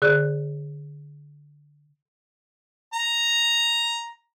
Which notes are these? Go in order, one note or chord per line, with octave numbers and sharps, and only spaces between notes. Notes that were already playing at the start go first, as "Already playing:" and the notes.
D3 G#4 D5 F#6
A#5